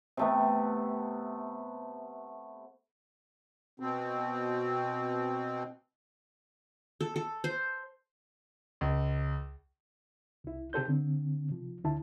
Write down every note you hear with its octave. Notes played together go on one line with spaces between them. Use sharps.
C3 A3 B3
B2 C4
A4
A4
C5
C#2
C2 E4
C3 G4 A4 C5 G6
D3 C4
C3 F3
D2 D3 E4 A5